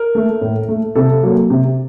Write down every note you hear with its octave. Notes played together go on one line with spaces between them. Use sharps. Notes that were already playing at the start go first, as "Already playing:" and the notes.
Already playing: A#4
A3
A2
A3
C3 A4
F#3 A#3
C3